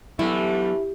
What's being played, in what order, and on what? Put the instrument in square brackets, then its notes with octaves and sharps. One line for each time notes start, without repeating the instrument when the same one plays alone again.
[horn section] D3 E3 A3 [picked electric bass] F#3 B3 [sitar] G3 [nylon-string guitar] E4